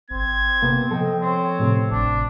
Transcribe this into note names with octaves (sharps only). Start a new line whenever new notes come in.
G#1 C4 G#6
C3 A#3 B3
F3 A4 D#5 G5
C4 C#5
A2 C3
G#1 D4